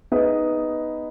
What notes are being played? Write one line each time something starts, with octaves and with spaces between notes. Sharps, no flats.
B3 D#4 G#4 B4 D#5